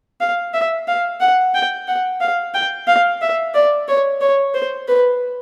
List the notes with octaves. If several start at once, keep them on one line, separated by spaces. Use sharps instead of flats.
F5
E5
F5
F#5
G5
F#5
F5
G5
F5
E5
D5
C#5
C#5
C5
B4